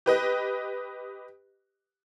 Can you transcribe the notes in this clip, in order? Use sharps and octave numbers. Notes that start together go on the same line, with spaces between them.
G4 B4 D#5